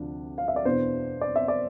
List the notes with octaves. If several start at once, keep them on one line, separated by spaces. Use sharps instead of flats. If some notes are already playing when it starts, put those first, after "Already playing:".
Already playing: D2 C3 F3 D4
F5
E5
D5
E2 B2 B3 D4 C5
D5
E5
D5